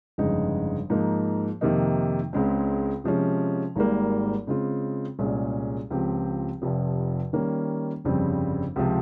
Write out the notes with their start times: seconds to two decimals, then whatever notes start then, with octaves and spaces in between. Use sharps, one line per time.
0.18 G1 F2 C#3 G#3 D#4
0.90 G#2 F3 A#3 D#4
1.61 F2 C3 D#3 A#3 D#4
2.33 C#2 C#3 G#3 C4
3.04 C3 F3 G#3 C#4
3.76 G#1 G#2 G3 A#3
4.47 C#3 G#3 C4 F4
5.19 C2 A#2 G#3 C#4 G#4
5.91 C#2 C#3 F3 C4 G4
6.62 F1 F2 C3 F3
7.33 D#3 G3 A#3 C#4
8.05 G1 F2 C#3 G3 C4
8.76 C#2 C3 F3